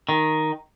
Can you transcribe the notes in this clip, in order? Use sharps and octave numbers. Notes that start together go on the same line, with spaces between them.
D#3